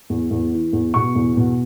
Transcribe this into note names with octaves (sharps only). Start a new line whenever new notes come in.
E2
E2
E3
E2
B2 C#6
E2
B2